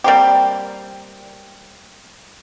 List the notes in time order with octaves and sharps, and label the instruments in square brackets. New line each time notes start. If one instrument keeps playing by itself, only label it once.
[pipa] G3 A#3 C4 G4